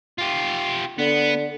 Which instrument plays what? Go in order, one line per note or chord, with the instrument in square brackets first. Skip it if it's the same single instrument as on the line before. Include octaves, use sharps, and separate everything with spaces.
[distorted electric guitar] F4 G4
[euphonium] D3 [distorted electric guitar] B3